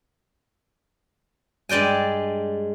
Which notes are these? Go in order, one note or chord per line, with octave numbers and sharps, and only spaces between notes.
G2 G#3 D5 G5 G#5